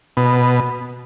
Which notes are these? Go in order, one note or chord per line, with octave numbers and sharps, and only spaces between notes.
B2